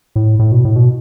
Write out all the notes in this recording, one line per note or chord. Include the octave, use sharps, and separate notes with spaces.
A2
A2
B2
A2
B2